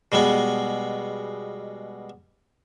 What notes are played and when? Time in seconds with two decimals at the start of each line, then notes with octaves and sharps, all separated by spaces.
0.12 B2 G3 G#3 B3